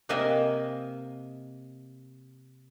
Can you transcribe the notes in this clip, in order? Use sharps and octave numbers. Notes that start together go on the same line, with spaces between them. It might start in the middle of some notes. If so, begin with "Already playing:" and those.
C3 A#3 D#5 E5 G#5